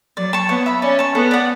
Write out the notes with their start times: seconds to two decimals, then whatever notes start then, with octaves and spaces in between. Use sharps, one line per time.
0.17 F#3 D5
0.33 A5 C#6
0.49 B3 C#5
0.66 E5 B5
0.82 C#4 D5
0.99 A5 C#6
1.15 B3 A4
1.31 D5 F#5